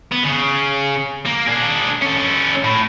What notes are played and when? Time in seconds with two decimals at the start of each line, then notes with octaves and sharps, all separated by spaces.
0.12 B3
0.24 C#3
1.26 A#3
1.48 D4 G#4
2.02 C#4 A4
2.64 A2